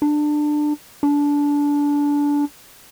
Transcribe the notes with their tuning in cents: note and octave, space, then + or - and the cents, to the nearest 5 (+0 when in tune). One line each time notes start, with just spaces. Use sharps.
D4 +20
D4 -20